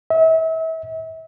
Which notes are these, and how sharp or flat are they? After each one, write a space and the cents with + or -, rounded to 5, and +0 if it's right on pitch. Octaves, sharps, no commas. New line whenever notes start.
E5 -35